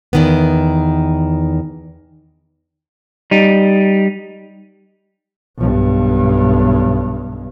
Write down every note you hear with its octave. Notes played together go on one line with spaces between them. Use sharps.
E2 D#3 B3
G3 D#4
B1 G2